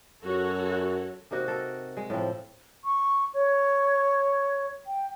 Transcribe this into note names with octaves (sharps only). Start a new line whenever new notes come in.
F#2 F#4 A4 C#5
C3 A#3 D#4 F#4
A4 A#4
G#3
A2 F3 C4
C#6
C#5
G5